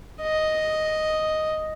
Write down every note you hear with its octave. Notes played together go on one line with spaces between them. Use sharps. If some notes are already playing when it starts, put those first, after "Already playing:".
D#5